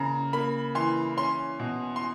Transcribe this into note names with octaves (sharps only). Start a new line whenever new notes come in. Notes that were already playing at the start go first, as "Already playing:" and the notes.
Already playing: C#3 A#3 A#5
A#3 B5
E3 C6
C#4 C6
B2
C6